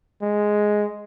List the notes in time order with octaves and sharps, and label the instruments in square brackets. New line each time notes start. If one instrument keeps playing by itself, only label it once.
[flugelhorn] G#3